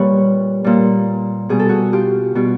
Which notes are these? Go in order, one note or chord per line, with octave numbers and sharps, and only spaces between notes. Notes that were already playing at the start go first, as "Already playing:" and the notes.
Already playing: A#2 G3 B4 C#5
A#2 G3
B2 G3 G#4
A4
F#4 G#4
F4 G4
B2 G3 F#4